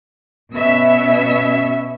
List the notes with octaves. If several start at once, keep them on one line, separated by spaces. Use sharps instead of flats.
B2 C#4 E5